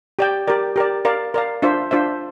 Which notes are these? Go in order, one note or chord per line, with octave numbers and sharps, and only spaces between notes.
G4 D5 G5
G4 A#4 D5
G4 A#4 D5
A#4 D5 F5
A#4 D5 F5
D4 F4 C5 E5
D4 F4 C5 E5